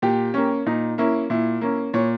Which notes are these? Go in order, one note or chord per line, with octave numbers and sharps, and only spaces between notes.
A#2 G4
A#3 C#4
A#2 D#4
A#3 C#4 E4
A#2 E4
A#3 C#4
A#2 C#5